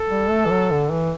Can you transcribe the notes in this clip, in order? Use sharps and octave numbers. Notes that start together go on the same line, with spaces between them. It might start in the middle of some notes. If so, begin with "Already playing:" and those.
Already playing: A4
G3
A3
E3
F#3
D3
E3